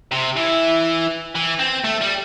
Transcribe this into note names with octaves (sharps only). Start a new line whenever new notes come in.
C3
E3
E3
C4
A3
G3